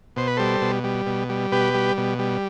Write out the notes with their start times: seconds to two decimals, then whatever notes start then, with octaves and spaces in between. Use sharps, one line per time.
0.16 B2 C5
0.28 B4
0.37 G3 A4 C5
0.62 B2
0.84 G3
1.07 B2
1.30 G3
1.52 B2 G4 B4
1.74 G3
1.98 B2
2.19 G3